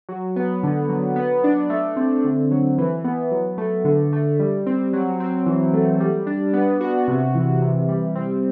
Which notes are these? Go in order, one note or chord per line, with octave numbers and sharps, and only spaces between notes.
F#3
B3
D3
F#3
B3
D4
A3
C4
D3
F#3
E3
B3
F#3
A3
D3
A3
G3
C4
F#3
C4
E3
A3
G3
D4
B3
F#4
C3
E3
C3
G3
C4